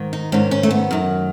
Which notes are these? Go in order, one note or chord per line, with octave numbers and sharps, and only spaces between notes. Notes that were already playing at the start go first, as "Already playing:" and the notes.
Already playing: G#2 D#3
D#4
G#2 D#3 C#4
C#4
A3
B3
F#2 D#3